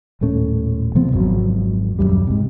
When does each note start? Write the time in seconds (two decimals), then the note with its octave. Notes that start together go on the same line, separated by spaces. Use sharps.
0.21 D#1 A2 A3 C#4
0.95 C3 F3 B3 C4
1.12 G#1 F2 F#3
1.99 D#1 C#2 F#2 G3
2.27 G#2 C3